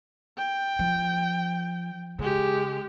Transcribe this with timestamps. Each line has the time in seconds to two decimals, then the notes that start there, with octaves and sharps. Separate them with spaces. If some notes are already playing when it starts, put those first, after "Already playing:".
0.38 G5
0.79 F3
2.19 C#3 G#3 G4